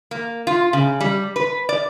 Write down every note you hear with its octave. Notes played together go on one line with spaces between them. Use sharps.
A#3
F4
C#3
G3
B4
D5